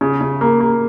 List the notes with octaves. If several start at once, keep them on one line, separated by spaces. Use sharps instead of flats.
C#3
C#3
A#3
A#3